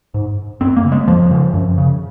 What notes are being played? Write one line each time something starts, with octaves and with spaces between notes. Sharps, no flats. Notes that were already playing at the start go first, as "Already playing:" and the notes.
G#2
F#2 C4
A#3
C#3
G#3
F2 F3
C#3
F#2
C#3